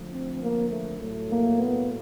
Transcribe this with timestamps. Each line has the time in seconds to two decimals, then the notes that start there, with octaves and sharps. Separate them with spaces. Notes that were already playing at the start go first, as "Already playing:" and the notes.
Already playing: D3 F3 A3
0.13 C4
0.43 A#3
0.71 A3
1.00 A2 F#3 A3
1.29 A#3
1.58 B3